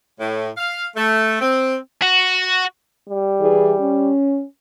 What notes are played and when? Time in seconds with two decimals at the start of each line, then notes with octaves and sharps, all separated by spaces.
0.19 A2
0.58 F5
0.96 A3
1.40 C4
2.02 F#4
3.09 G3
3.41 E3 G#4 D5
3.80 C#4